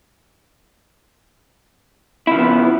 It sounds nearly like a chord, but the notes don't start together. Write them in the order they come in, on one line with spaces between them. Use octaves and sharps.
E4 C#3 F3 B3